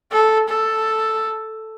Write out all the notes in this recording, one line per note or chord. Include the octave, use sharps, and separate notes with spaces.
A4
A4